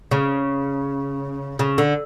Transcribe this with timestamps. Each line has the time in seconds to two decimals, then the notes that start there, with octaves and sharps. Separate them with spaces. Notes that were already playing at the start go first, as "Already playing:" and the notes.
0.11 C#3
1.59 C#3
1.78 D3